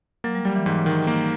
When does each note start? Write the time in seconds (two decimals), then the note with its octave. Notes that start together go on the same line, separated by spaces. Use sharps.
0.24 F#3 A#3
0.35 G3
0.45 F#3 G3
0.55 E3
0.66 G#2 E3
0.86 D#3
1.07 A#3